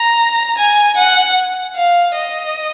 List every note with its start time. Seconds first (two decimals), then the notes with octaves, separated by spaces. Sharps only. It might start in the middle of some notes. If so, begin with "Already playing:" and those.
Already playing: A#5
0.57 G#5
0.97 F#5
1.76 F5
2.15 D#5